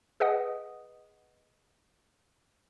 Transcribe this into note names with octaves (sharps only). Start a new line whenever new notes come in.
G#4 B4 D#5 F#5 D#6